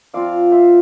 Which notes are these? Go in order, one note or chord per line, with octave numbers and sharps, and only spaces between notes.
F3 C4 F4 D5 F5
C5 E5